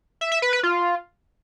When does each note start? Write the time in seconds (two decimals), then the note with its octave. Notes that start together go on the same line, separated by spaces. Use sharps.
0.21 E5
0.32 E5
0.42 B4
0.53 B4
0.63 F4